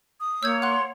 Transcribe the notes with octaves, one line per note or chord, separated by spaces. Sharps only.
D#6
A#3 C#5 E6 G6 G#6
F#5 C6 D6 F#6